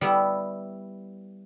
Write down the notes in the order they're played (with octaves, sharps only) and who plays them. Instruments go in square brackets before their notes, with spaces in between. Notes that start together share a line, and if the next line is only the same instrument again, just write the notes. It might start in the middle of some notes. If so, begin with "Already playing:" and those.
[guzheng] G3 B3 E4